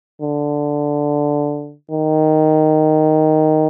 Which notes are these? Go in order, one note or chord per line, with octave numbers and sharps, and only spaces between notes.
D3
D#3